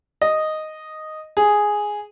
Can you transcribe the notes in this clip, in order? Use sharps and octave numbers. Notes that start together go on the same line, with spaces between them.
D#5
G#4